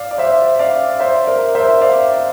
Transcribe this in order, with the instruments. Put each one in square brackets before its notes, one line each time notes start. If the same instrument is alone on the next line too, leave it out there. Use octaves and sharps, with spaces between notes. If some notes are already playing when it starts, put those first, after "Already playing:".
Already playing: [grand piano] D5 F5
D5
C5 E5
D5 F5
C5 E5
A#4 D5
C5 E5
D5 F5